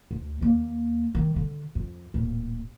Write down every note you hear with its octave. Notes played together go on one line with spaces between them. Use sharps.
D2
D#2 A#3
D#3 G3
D3
F2
D1 A#2